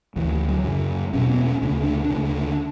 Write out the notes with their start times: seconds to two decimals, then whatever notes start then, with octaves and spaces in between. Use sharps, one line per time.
0.16 D2 D3 E3
0.32 E3
0.48 F#3
0.64 F#2 C#3
1.13 E2 B2 C#4
1.30 B3
1.45 C#4
1.62 D2 C#3 D4
1.83 D4
2.04 D4
2.10 D2 C#3
2.25 D4